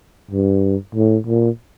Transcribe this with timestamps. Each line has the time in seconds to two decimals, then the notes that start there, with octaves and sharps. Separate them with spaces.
0.31 G2
0.95 A2
1.27 A#2